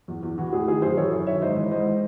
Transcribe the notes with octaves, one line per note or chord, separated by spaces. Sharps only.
E2
E2
E3 F#4
A2 G#4
D#3 G#4
F#2 G#4 C5
E3 A4 C#5
F#2
D#3 C#5 E5
G#2 C5 D#5
E3 C5 D#5
G#2 C5 D#5
E3